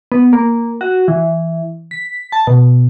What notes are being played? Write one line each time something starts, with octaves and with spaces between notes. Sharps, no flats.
B3
A#3
F#4
E3
B6
A5
B2